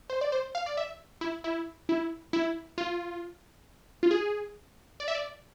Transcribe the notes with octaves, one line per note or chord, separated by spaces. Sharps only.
C5
D5
C5
F5
D5
E5
E4
E4
E4
E4
F4
F4
G#4
D5
E5
D5